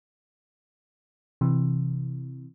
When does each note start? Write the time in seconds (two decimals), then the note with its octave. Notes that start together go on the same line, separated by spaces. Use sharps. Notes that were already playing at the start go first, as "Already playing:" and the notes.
1.41 C3 E3